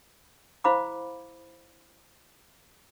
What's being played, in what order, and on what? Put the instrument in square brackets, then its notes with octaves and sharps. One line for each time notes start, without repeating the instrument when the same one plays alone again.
[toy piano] E4 C5 F5 B5 D6